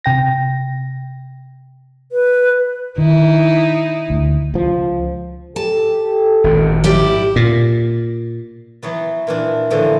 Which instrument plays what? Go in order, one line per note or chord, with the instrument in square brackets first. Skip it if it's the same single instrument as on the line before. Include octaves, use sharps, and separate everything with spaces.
[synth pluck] C3 G5 A#6
[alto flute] B4
[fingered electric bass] D#3 [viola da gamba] D#4 E4
[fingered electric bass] D2
[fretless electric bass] C#2 F3
[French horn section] G4 A4 [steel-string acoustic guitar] A5
[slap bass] G#1 A#2
[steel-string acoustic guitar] E4 G4 D5
[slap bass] A#2
[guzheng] E3 F#3 B3
A#2 E3 D4
A2 D3 E3 F3